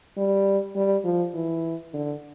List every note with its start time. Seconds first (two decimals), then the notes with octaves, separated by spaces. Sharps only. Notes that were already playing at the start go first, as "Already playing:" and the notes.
0.17 G3
0.76 G3
1.04 F3
1.34 E3
1.93 D3